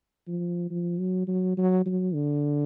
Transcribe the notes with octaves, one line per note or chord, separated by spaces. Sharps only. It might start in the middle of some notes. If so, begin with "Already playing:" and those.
F3
F3
F#3
F#3
F#3
F#3
D3